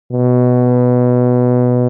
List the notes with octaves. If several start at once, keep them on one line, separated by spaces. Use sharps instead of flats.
B2